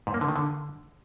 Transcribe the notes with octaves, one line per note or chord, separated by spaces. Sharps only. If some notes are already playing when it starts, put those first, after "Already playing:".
G#2
A#3
D3
D#3
D3